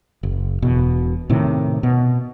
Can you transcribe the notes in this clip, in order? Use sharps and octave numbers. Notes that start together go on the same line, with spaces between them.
F#1
E1 B2
A2 C3 D#3
B2